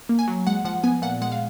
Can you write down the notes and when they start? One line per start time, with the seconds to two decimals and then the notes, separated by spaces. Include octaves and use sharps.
0.09 A#3
0.19 G#5
0.28 F#3
0.47 G#3 F#5
0.65 F3 F#5
0.84 B3 G#5
1.02 A#2 F#5
1.22 G#3 F#5
1.32 F5